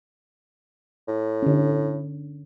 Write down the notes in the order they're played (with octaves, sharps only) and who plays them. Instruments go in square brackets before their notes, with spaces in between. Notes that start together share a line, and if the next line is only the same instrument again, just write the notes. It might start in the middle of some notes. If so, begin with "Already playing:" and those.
[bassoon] A2
[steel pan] D3 C#4